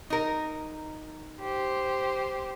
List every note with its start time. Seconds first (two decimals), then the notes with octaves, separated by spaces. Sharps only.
0.10 D#4 A#4
1.41 G4 C5